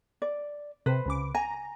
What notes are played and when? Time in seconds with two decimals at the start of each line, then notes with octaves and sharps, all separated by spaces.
0.22 D5
0.86 C3 B4 C5
1.06 C#2 C#3 D6
1.35 G#5 A#5